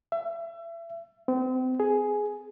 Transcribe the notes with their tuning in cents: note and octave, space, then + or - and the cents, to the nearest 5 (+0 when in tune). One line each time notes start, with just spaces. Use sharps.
E5 +30
C4 -35
G#4 +10